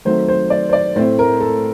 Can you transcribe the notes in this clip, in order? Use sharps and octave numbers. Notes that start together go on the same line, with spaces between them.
D#3 F#3 A3 C4 C5
C5
D5
C5
D5
A2 A3 C4 C5
A#4
A4